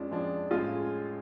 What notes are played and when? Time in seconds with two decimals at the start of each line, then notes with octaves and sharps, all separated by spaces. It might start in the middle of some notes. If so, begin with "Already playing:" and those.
Already playing: F2 F3 G#3 C#4 D4 F4
0.11 F2 F3 G#3 D4
0.51 A2 G#3 C#4 F4 G#4